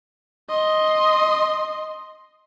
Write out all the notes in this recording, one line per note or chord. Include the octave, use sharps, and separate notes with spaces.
D#5 C6